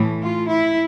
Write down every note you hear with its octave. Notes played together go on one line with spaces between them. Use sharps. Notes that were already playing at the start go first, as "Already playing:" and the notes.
Already playing: A2 E3 A3
F4
E4